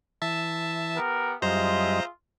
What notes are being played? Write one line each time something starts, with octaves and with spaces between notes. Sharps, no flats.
E3 E5 A5
B3 G4 A#4
F#2 G3 F4 G#4 C5 D#5 E5 A#5